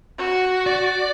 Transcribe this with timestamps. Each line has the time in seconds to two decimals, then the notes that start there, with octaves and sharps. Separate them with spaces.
0.19 F#4
0.67 D5